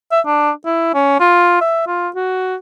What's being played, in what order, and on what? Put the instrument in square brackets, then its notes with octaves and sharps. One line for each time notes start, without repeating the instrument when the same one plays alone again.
[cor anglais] E5
D4
E4
C#4
F4
E5
F4
F#4